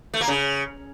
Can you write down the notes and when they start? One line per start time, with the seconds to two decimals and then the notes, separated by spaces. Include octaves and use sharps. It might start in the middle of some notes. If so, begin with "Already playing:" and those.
0.14 A3
0.21 A#3
0.28 C#3